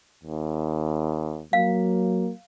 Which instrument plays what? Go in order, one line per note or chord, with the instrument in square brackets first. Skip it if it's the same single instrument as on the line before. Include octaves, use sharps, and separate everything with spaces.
[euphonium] D#2
[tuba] F#3 [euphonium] A#3 [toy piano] F5